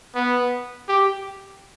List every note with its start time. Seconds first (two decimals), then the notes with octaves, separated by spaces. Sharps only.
0.15 B3
0.89 G4